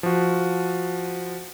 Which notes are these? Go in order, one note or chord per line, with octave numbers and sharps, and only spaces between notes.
F3 F#4